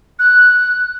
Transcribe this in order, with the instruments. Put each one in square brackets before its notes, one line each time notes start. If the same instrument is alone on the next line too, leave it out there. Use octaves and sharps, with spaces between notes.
[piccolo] F#6